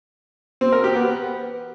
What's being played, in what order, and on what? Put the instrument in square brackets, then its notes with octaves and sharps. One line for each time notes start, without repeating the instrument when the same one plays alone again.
[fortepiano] C4
A#4
G4
B3